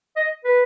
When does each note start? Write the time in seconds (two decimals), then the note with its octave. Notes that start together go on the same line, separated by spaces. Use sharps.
0.16 D#5
0.44 B4